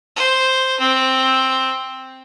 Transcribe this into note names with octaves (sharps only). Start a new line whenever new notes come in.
C5
C4